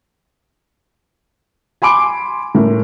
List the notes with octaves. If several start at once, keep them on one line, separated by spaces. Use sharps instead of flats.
G#5 B5 C6 D6 D7
A2 A#4